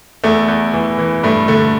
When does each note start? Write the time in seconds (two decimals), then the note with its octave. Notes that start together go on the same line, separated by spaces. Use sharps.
0.24 E2 A3
0.48 E2
0.74 E3
0.98 E3
1.23 G2 A3
1.48 D3 A3